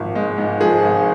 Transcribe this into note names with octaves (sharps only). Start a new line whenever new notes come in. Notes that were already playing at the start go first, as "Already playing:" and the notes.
Already playing: G#1 F3
G#3
G#2
F3 G#4
G#1